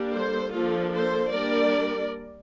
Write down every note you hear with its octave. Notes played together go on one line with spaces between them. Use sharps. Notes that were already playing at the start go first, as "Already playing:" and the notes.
Already playing: G3 A#3 D4
A4 C5
F3 A#3 D4 F4 A4
A4 C5
G3 A#3 D4 A#4 D5